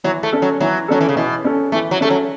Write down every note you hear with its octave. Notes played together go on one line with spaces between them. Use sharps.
E3 F#3
A3
C#4 A4
F#3
E3 F#3
F#3 C#4 A4
E3
C#3
B2 E3
C#4 A4
E3 A3
F#3
A3 C#4 A4
F#3